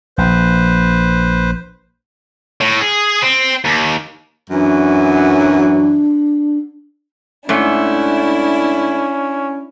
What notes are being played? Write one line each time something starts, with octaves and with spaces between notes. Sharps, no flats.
A#1 B4 C5
A2
G#4
C4
D#2
F#2 E3 F#3 D4
G#2 A3 C#4 D4 E4